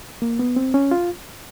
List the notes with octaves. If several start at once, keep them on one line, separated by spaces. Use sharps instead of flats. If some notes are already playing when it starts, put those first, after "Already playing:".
A#3
B3
C4
C#4
F4